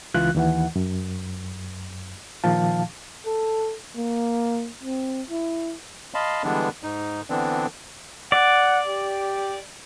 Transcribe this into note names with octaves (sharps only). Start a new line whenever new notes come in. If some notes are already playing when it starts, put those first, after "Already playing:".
C#2 E3 F4 F#6
D#2 E3 F#5
F#2
A#2 D#3 F3 F5 A5
A4
A#3
C4
E4
D#5 F5 A5 B5 C6
D3 E3 G3 G#3 B3 D4
G#2 D#4
D3 E3 B3 C4 D4
D5 F#5
G4